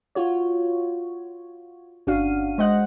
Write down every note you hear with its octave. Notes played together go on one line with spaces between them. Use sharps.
F4 F#4 C#5
G1 C#4 D4 F#4 F5 D#7
G#3 C5 D#5 F#5 F#6